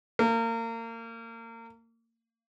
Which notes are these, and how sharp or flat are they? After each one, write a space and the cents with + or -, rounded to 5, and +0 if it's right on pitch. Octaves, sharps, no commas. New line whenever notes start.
A#3 -30